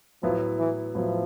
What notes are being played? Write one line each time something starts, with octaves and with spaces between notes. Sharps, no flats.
A2 F3 F#3 B3 E4
E3
A2 F3 F#3 B3 E4